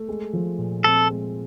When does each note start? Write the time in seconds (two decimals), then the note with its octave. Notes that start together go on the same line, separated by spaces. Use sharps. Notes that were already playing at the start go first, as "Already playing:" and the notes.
Already playing: A3
0.09 G#3
0.33 F3
0.59 A#2
0.84 C4 A4
1.10 G#3